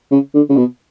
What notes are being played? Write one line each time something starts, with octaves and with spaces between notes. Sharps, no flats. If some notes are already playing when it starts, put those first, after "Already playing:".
C#3
D3
C#3
B2